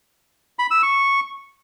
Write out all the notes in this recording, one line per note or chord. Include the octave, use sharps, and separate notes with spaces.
B5
E6
C#6